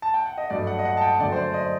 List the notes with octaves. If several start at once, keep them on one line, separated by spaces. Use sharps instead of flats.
A5
G5
F#5
D#5
G2 F#3 A3 D5
F#5
D#5
F#5
A5
G5
F#2 D3 A3 D5
C5
D5
D#5